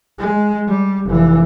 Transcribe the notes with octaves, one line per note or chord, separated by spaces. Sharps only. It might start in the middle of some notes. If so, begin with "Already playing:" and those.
G#3
G3
F1 E3